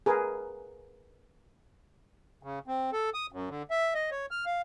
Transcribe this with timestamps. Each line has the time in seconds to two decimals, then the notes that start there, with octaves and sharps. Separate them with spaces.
0.06 G#4 A#4 B4
2.43 C#3
2.67 C4
2.93 A4
3.14 D#6
3.32 F#2
3.49 D3
3.71 E5
3.94 D#5
4.11 C#5
4.31 F6
4.46 F5